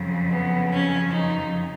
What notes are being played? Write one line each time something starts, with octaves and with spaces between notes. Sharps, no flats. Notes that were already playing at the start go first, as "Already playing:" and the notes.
Already playing: F2 C#3 F#3
B3
C#4
D#4